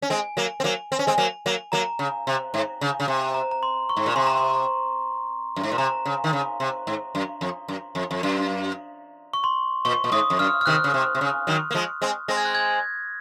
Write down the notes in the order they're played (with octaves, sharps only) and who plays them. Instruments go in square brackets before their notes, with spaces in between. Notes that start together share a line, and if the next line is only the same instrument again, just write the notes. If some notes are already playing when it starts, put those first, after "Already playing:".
[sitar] C#4
[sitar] G#3 C4 [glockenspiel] G#5
[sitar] F#3 A#3
C4
F#3 A#3
C4
C#4
G#3 C4
F#3 A#3
F#3 A#3
[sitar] F#3 A#3 [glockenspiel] A#5
[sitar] C#3
C3
G#2
C#3
C#3
C3
[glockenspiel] A#5
A#5
C6
C#6
[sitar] G#2
A#2
[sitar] C3 [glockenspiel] C6
[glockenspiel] A#5
C6
[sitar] F#2
G#2
A#2
[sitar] C3 [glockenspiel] A#5
[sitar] C#3
D#3
C#3
C3
G#2
F#2
F2
F#2
F2
F2
F#2
[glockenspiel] C#6
C6
[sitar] A#2 [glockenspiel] C#6
[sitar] A#2
[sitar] G#2 [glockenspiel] D#6
[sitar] F2
[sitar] F#2 [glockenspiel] F6
[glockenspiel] F6
[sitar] C3 D#3 [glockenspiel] F#6
[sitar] C#3
C3
C3
C#3
D#3 F#3
A#3
F3 G#3
G#3 C4
[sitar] G#3 C4 [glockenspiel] A#6
[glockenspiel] G#6
F#6
G#6